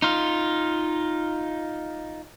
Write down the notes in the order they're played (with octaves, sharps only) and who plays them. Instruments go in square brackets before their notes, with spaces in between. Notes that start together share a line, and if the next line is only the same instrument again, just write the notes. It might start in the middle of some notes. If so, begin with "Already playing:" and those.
[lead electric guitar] D#4 F4